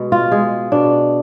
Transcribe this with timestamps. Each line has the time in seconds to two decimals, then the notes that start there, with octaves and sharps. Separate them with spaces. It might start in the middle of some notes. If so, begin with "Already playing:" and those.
Already playing: B2 G#3
0.12 F4
0.32 G#3 G#4
0.72 B2 D4